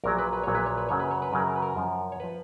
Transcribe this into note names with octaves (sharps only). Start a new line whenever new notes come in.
A#1 A#2 F#3 A#4
B4
B4
A#1 A#2 F#3 C#5
B4
C#5
B4
F#2 C#3 F#3 C#5
B4
C#5
B4
F#2 C#3 F#3 A#4
A#4
B4
A#4
F#2 F3
C#5
F3 B4